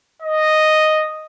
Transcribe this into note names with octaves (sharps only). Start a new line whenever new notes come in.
D#5